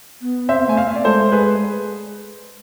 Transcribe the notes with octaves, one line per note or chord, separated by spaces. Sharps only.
B3
C4 C5 E5
A3 G#5
F5
A3 E5
D5
G#3 A4 C5
G#4 B4